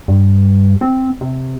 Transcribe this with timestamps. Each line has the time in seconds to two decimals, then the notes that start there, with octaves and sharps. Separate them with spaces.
0.08 G2
0.81 C4
1.21 C3